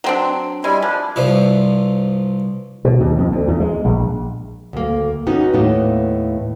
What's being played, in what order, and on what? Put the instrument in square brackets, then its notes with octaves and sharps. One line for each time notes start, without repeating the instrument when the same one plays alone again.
[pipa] F#3 C4 D4
[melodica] G3 E4 G#5 [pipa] G#3
[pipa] F3 [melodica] D4
[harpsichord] C2 G2 F3 E5
[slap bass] B2
D#2
F2
D2
E2
G#3
A#1
[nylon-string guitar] D2 A#3
B3 C#4 D#4 F#4
D#2 A2 A#3 B3